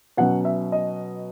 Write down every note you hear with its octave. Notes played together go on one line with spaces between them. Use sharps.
B2 F#3 C#4 F#5
E5
D#5